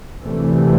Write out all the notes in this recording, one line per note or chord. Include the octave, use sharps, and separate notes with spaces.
D2 C3 E3 A3